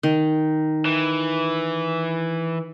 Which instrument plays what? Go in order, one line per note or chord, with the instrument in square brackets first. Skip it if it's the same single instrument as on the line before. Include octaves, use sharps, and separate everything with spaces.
[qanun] D#3
[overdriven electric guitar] E3